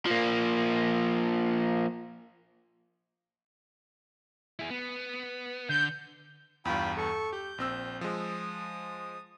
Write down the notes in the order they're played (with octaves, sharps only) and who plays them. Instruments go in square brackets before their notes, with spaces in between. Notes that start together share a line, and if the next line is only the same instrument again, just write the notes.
[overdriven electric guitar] F3 A#3
[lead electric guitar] E4 G#4
B3
[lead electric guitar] D3 [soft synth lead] G6
[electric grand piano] E2 G2 [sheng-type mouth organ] F4 G5 B5
[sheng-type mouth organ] A4 C#6
[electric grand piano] G4 [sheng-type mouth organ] G6
[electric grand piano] A#1 C4 E6
[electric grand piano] F3 G#3 [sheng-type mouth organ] D#6